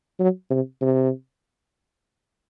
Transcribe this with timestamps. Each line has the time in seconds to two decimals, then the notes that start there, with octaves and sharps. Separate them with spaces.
0.20 F#3
0.51 C3
0.82 C3